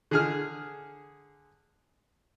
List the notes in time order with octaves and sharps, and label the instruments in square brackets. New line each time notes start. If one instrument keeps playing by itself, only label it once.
[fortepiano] D3 G#4 F6